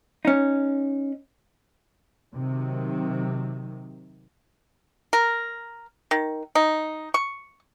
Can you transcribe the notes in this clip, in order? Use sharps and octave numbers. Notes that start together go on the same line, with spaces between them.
C#4 D#4
C3 D#3 F#3
A#4
D#3
D#4
C#6